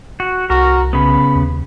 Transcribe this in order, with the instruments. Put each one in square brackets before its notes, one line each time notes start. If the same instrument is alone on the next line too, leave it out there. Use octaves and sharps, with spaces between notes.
[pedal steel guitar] F#4
[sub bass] C2 [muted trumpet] F#4 [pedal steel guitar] A#4
[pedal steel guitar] C#3 B3 [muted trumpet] B5
[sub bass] D#2